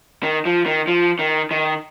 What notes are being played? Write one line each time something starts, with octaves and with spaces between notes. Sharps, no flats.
D#3
F3
D#3
F3
D#3
D#3